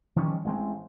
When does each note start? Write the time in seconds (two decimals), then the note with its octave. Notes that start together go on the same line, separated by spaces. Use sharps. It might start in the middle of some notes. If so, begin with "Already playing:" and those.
0.16 D#3 F3 G3 C#4
0.44 A1 G#3 C4